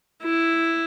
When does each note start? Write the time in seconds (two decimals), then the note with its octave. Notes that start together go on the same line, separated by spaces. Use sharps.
0.23 E4